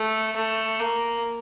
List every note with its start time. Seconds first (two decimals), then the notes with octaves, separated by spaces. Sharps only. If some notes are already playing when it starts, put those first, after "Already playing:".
Already playing: A3
0.36 A3
0.79 A#3